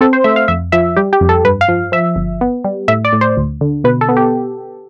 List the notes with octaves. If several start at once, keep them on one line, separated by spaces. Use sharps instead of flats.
C4 A4
C5
A3 E5
F5
F2 E5
F3 E5
G3 G4
G4
F2
A4
G2 B4
F5
F3
F3 E5
G1
B3
G3
A2 E5
D5
A2
C5
D2
D3
B2 B4
A4
B3
G4